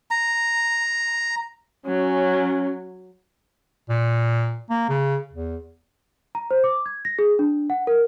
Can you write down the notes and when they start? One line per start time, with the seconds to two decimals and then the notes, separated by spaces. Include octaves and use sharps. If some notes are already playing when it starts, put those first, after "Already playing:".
0.11 A#5
1.86 F#3 C#4
3.89 A#2
4.70 A#3
4.89 C#3
5.32 E2
6.35 A#5
6.51 C5
6.64 D6
6.86 G#6
7.05 A#6
7.19 G#4
7.39 D4
7.70 F#5
7.87 A#4